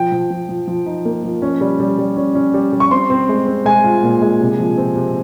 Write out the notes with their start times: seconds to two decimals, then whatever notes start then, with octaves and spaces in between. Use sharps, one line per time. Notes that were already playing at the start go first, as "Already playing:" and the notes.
Already playing: F3 G5
0.12 F3
0.30 F3
0.49 F3
0.68 F3
0.86 D#4
1.05 A#3
1.24 F3
1.42 C#4
1.61 G3
1.80 G3
1.99 G3
2.17 C#4
2.35 C#4
2.54 G3
2.73 G3
2.80 C#6
2.91 C4 C6
3.10 C4
3.29 G#3
3.47 C4
3.66 G#3 G#5
3.84 F4
4.03 A#2
4.22 G#3
4.40 C3
4.59 F3
4.77 C4
4.96 C3